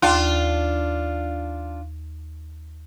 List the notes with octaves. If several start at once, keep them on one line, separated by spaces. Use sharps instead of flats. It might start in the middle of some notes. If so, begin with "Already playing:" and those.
D#2 D4 F4